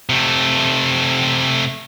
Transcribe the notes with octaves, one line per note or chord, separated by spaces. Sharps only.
C3 A3